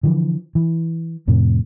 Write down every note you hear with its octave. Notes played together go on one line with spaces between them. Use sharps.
D3 E3 F3
E3
F2 A2 C3